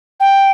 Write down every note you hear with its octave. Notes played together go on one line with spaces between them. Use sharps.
G5